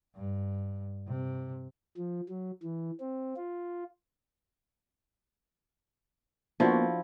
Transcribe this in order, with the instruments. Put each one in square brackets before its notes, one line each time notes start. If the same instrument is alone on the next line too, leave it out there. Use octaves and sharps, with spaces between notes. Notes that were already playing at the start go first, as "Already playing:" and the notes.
[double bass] G2
C3
[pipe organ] F3
F#3
E3
C4
F4
[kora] F3 E4 [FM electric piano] A#3 B3 C5 [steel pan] D4 F#4